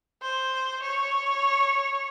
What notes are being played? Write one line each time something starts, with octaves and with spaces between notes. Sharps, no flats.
C5
C#5